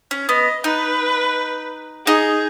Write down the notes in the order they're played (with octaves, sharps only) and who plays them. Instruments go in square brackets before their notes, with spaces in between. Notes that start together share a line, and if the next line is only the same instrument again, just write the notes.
[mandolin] C#4
[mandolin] B3 [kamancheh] D#5
[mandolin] D#4 [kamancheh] B4
[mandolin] D#4 [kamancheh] G#4